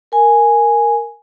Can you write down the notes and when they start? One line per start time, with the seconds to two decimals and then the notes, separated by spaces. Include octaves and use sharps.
0.12 A#4 G#5